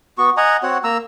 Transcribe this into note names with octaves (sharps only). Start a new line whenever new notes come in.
B3 F#4 C#6
D#5 F#5 G#5 A#5
C4 F#4 C#5 F#5
A#3 A#5 E6